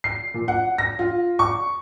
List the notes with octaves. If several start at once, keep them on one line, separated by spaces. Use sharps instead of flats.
C7
A#2
F#5
A#6
F4
C#6